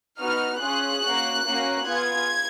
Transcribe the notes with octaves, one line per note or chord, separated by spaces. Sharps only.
B3 D#4 F#4 F6
C#4 F4 G#4 F#6
A#3 C#4 F#4
A#3 C#4 F#4
B3 F4 G#4 G#6